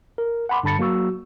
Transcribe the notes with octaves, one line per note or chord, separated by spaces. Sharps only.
A#4
F#5 G#5 B5 C6 D6
G2 D3 A5 B5 A6 C#7
F#3 A#3 F#4 C#6 E6